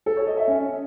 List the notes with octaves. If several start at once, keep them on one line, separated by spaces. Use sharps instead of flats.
A4
C#5
D#5
E5
C#4